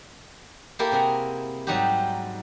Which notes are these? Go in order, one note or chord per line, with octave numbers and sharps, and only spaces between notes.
A#3 E4 G4 A4 A#4
C3 G#4 A#4 F#5 A#5
G#2 F#3 G3 D#4 F#4 G4